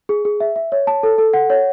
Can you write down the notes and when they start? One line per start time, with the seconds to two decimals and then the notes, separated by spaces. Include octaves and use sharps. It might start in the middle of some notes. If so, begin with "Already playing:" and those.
0.09 G#4
0.25 G#4
0.40 E5
0.56 E5
0.72 C#5
0.87 A5
1.03 A4
1.18 A4
1.34 F#5
1.50 C#5